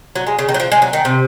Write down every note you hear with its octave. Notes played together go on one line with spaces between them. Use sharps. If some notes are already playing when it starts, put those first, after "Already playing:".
F#3
G#3
C#3
D#3
F#3
F3
G#3
F#3
D#3
C3